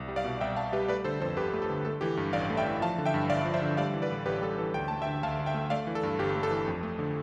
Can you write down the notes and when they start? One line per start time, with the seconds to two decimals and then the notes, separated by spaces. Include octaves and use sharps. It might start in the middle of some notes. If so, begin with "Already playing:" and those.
Already playing: C2
0.08 G3
0.16 D5 F5
0.24 B2
0.41 C2 E5 G5
0.56 C2 F5 A5
0.72 G3 G4 B4
0.88 A3 B4 D5
1.04 D3 A4 C5
1.20 F2 A4 C5
1.37 G1 G4 B4
1.53 A3
1.62 A4
1.70 D3
1.85 A3 A4
2.01 E3 G4
2.17 G2
2.33 A1 D5 F5
2.50 A3
2.57 E5 G5
2.66 E3
2.81 F3 F5 A5
2.98 D3
3.06 E5 G5
3.14 G2
3.30 G1 D5 F5
3.45 F3
3.54 C5 E5
3.62 D3
3.77 G3 D5 F5
3.94 E3
4.02 B4 D5
4.11 A2
4.26 A1 G4 B4
4.42 G3 A4
4.58 E3 A4
4.74 D2 G5
4.88 A3 A5
5.02 E5 G5
5.07 D3
5.23 D2 F5 A5
5.39 D2
5.46 E5 G5
5.54 A3
5.70 A3 D5 F5
5.87 E3
5.95 A4
6.03 G2
6.19 G1 G4
6.36 A3
6.43 A4
6.51 E3
6.68 F2
6.83 A3
6.99 D3